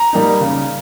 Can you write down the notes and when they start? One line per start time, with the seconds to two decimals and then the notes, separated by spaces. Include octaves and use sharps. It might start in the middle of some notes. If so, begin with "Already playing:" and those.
Already playing: A#5
0.13 G3 A#3 D#4
0.41 C#3